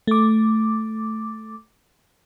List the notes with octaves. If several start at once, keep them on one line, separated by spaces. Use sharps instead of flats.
A3 D6